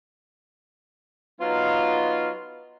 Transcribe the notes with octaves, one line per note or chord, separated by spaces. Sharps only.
F#3 B3 D#4 F4